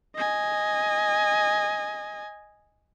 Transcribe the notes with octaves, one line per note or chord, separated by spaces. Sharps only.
D#5 G#5